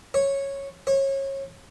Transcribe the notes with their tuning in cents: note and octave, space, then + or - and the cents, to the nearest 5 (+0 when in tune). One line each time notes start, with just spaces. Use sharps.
C#5 -10
C#5 -30